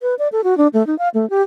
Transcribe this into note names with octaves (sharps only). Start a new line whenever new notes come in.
B4
D5
A4
F#4
D4
A3
D#4
F5
A3
G4